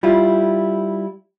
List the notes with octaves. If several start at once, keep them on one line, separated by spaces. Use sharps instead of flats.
G3 E4 F4